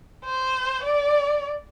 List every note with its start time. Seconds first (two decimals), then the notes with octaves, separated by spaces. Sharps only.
0.24 C5
0.83 D5